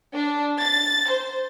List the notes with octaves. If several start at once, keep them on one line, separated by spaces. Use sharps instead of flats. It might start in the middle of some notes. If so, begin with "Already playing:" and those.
D4
A6
C5